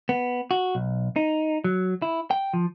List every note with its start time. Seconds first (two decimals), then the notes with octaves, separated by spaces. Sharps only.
0.09 B3
0.51 F#4
0.75 B1
1.16 D#4
1.64 F#3
2.02 E4
2.31 G5
2.54 F3